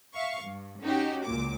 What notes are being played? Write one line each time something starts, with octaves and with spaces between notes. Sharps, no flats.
E5 F5 C#6
G2
C#4 D#4 F#4 G4
C#2 A#2 D6